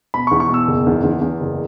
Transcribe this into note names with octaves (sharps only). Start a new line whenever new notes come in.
B2 B5
E2 C#6
C#6
B2 E6
F#1
E2
E2
E2
F#1